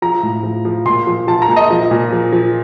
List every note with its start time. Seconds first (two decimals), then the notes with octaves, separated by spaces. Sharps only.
0.02 F3 A#5
0.23 A2
0.43 F3
0.65 F3
0.85 A#2 C6
1.07 F3
1.27 F3 A5
1.42 A#5
1.49 A#2
1.56 D#5
1.71 F3
1.91 A#2
2.13 F3
2.32 F3